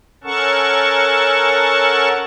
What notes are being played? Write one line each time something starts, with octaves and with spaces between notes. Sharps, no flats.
C#4 A4 A#4 F#5 A5 C#6